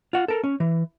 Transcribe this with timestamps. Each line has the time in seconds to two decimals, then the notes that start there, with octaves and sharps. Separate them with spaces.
0.13 F4 F#5
0.28 A4 A#4
0.44 C#4
0.60 E3